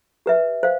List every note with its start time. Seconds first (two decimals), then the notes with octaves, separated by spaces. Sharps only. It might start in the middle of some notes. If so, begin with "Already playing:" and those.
0.26 G4 B4 E5
0.63 C5 F5